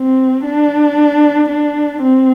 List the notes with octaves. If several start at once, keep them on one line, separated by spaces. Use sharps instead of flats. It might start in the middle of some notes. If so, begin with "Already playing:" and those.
Already playing: C4
D4
D4
C4